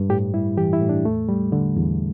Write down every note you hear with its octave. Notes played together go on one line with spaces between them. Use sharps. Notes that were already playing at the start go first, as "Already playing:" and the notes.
Already playing: G2
A2 G4
G3 E4
E3 G4
E4
A2
D4
E2 A3
G3
D3
E2